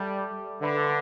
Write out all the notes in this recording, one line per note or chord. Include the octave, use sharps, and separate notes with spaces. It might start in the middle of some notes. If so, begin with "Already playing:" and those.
Already playing: G3 A4 E5 A5 D6
D3 B4 E5 B5 D6